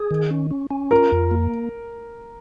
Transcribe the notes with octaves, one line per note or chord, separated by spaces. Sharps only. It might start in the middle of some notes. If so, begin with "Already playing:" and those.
Already playing: G#4
D#3
C#4
C#4
C#4
F4 A#4
F2
A#3